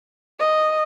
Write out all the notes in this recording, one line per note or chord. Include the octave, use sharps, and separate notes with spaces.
D#5